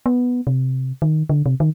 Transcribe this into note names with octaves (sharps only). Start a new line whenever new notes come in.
B3
C3
D#3
D3
C3
D#3